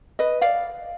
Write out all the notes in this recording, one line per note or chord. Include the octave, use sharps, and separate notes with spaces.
B4 D#5
D5 F5